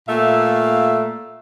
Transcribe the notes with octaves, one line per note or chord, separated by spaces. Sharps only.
A#2 A3 E5 F5